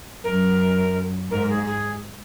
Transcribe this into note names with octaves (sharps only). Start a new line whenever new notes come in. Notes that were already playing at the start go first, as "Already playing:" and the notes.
F#2 A#4
G#2 A#4
G#4
G#4